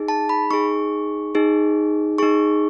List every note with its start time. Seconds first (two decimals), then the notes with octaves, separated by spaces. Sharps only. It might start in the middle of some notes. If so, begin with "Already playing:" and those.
Already playing: D#4 G#4
0.08 A5
0.29 B5
0.51 D#4 G#4 C#6
1.35 D#4 G#4
2.18 D#4 G#4 C#6